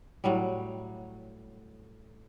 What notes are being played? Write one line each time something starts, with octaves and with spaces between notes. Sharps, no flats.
A2 F#3 G3